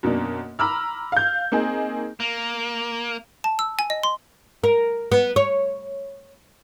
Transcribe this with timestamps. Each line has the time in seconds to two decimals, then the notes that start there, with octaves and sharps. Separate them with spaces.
0.03 F#2 B2 A#3 D4
0.59 A#5 B5 D6 E6 F6
1.12 F5 G6
1.52 A#3 C4 D#4 G#4
2.20 A#3
3.44 A5
3.59 E6
3.79 G#5
3.90 D#5
4.03 C6
4.64 A#4
5.12 B3
5.36 C#5